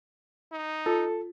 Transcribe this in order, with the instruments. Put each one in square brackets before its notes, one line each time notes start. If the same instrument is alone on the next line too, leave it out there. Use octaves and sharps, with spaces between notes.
[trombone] D#4
[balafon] F4 [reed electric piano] A4